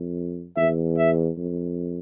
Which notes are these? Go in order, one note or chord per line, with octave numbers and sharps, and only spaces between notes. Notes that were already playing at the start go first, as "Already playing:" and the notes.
Already playing: F2
E2 E5
E5
F2